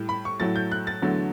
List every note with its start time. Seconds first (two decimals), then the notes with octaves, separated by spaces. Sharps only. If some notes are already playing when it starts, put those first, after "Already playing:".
Already playing: A2 G3
0.09 B5
0.25 C#6
0.40 A2 F#3 A3 A6
0.56 G6
0.72 F#6
0.87 A6
1.02 E2 D3 F#3 A3